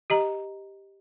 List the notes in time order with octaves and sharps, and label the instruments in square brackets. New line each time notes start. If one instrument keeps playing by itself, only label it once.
[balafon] G4 D#5 A#5